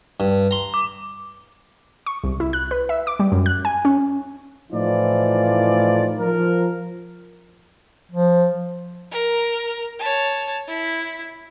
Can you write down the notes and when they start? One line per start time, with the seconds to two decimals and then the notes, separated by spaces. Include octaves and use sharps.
0.20 G2
0.51 A#5 C6
0.74 D6
2.06 C#6
2.24 C2
2.40 E4
2.53 F#6
2.71 B4
2.89 E5
3.07 D6
3.19 G3
3.32 F#2
3.46 F#6
3.65 G#5
3.85 C#4
4.72 A2 E3 F3 D#4 F4 D5
6.19 F3 A#4
8.12 F3
9.11 A#4
9.99 C#5 A5
10.68 E4